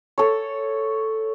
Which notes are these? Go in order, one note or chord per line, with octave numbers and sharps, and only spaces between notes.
A4 C#5